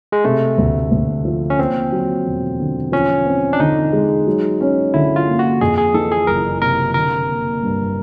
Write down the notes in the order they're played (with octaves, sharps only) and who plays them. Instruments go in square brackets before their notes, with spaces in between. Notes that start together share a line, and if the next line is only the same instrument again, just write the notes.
[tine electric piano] G#3
[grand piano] C3 [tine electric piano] A3
[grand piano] D2
D2
F3
[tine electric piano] C#4
[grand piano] D#2 [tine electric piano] C4
[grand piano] F#3
E1
D3
[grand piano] F3 [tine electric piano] C#4
[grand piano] C4
[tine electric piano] D4
[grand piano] D3 [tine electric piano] D#4
[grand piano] G#3
F#3
C#4
[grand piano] D3 [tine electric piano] E4
[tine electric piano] F4
[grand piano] A#3
[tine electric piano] F#4
[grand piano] F2 [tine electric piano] G#4
[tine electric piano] G#4
[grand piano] E3 [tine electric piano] A4
[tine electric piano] G#4
[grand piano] F#1 [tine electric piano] A#4
[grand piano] C3 [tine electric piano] A#4
[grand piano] D3 [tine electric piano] A#4
[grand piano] A#3
G2